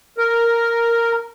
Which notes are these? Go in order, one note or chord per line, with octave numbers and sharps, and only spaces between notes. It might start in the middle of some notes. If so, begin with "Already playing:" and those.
A#4